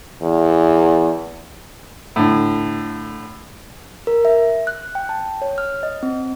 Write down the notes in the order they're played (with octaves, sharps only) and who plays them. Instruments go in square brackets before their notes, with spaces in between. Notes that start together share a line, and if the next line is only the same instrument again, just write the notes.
[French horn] E2
[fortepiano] A2 D3
[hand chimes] A#4
E5
F#6
G5
A5
C#5
F6
D#5
C4